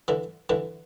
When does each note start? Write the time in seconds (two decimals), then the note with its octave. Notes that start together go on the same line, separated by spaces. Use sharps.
0.08 D3 E3
0.49 D3 E3